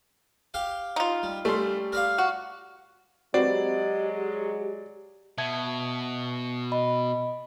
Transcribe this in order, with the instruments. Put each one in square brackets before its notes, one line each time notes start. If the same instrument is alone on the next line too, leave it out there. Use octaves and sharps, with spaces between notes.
[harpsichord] G4 F5 G5
[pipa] D#4 F4
[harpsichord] G3
[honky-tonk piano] G3 [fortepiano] A3 C6 [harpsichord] C#4
[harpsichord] A#4 D5 F5
[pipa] F#4
[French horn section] F#3 G#3 [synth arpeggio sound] C4 F#4 B4 [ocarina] G4 [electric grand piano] D5
[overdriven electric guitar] B2 [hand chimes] E5 A5 G#6
[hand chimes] D#5 B5